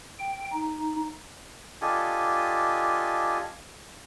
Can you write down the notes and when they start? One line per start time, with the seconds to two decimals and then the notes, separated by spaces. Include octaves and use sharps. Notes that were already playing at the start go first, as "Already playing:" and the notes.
0.19 G5
0.52 D#4
1.82 D4 F4 G4 A4 D#5 G#5